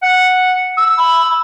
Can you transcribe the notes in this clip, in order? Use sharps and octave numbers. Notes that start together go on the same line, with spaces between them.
F#5
E6
B5